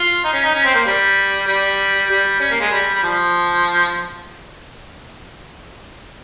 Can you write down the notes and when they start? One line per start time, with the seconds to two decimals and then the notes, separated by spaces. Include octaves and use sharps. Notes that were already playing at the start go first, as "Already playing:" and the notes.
Already playing: F4
0.24 D#4
0.33 C#4
0.44 D#4
0.55 C#4
0.65 C4
0.75 A#3
0.86 G3
1.47 G3
2.10 G3
2.40 C#4
2.51 A#3
2.61 G#3
2.72 G3
2.94 G3
3.03 F3